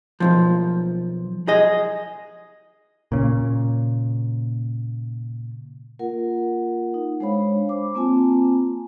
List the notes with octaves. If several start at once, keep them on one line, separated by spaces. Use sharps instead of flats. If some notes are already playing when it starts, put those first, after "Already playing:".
B1 G#2 F3
G#4 D#5
A#2 C#3
A#3 F4 A#4 F#5
D#4
G#3 D4 C5 C#5 F5 B5
C5 D6
A#3 C4 F4 G#5 A5